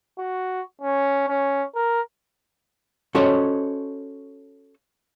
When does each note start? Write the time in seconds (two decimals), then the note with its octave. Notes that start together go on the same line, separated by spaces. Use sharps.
0.18 F#4
0.81 C#4
1.28 C#4
1.75 A#4
3.15 C#4 F#4 A4 C5 C#5 D#5